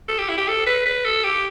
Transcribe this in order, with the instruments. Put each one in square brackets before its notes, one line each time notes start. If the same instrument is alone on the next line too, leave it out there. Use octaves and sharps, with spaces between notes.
[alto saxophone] A4
G4
E4
G4
A4
B4
B4
A4
G4